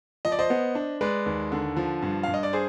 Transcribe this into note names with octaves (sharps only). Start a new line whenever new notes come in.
F3 D#5
D5
C5 D#5
B3
D4
G#3 B4 D5
D#2
D3
F3
G2
G2 F5
D#5
D5
G#4 C5